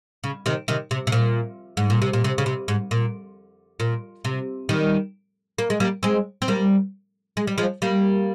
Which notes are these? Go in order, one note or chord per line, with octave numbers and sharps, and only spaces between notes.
C#3
C3 D#3
C3 D#3
C3
C3
A#2
G#2
A#2
C3
A#2
C3
C#3
C3
G#2
A#2
A#2
C3
D#3 G3
A#3
G#3
G3 A#3
G#3 C4
C4
G3 A#3
G#3
G3
F3 G#3
G3 A#3